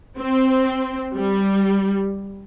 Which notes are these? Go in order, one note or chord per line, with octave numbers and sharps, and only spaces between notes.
C4
G3